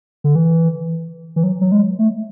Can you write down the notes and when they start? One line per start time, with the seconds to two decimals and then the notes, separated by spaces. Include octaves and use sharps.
0.24 D3
0.35 E3
1.36 E3
1.43 F#3
1.61 F#3
1.72 G#3
1.99 A3